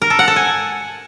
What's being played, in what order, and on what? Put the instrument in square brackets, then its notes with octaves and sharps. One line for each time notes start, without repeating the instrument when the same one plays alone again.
[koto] A#4
A4
F#5
A4
G#5